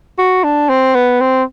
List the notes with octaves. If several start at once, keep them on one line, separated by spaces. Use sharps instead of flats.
F#4
D4
C4
B3
C4